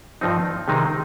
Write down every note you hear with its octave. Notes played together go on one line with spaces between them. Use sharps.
G2 F3 C4 D#4
C3 D#3 G#3 C4 D#4